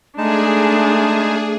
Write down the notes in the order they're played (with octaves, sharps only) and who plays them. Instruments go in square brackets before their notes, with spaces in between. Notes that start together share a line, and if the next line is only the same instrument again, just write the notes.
[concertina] G#3 D#4 A5 [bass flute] A3 [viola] D4 [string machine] G#4